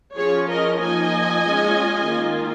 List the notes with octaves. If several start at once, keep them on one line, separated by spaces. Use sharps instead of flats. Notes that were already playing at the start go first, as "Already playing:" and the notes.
F3 C#4 F4 G#4 C#5
A#4 D#5
F3 A#3 D#4 D#5 G#5
G#3 C#4 F4
D#3 A#3 F4